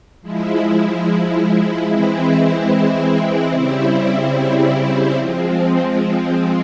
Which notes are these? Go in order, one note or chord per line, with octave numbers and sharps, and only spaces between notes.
F3 G#3 E4
E3 G#3 C4 E4
C#3 G3 C4 E4
F3 G#3 C4